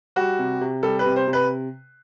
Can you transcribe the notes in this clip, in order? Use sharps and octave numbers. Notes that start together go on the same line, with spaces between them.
G3 F#4
C3
C3
G3 A4
B4
C3
C5
C3
B4